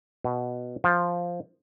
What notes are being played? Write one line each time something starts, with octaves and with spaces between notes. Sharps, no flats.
B2
F3